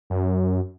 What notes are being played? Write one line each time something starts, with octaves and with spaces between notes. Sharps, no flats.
F#2